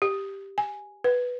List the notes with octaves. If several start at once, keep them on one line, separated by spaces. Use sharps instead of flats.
G4
G#5
B4